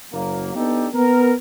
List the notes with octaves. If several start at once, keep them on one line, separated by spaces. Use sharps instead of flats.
F#1 F#3 A#3
B3 D4 D#4 G4 A4
B3 A#4